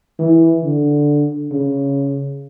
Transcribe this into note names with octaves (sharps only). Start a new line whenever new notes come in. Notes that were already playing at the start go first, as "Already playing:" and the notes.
E3
D3
C#3